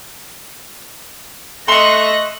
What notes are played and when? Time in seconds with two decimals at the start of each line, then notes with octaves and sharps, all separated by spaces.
1.68 A3 D#5 C6 C#6 F#6 A#6